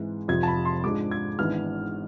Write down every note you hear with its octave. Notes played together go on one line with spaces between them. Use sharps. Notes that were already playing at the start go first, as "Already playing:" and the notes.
Already playing: G#2 E3 G#3 C4
F1 F2 C3 F3 G#6
A5
B5
C6
G#2 F3 G#3 D4 D6
G#6
G#1 G#2 E3 B3 D4 F6